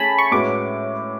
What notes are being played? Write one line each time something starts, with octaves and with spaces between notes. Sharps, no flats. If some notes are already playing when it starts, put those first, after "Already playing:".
Already playing: A3 C#4 G#4 G#5 A5 B5
C#6
A2 G#3 C#4 F#4 B4 D6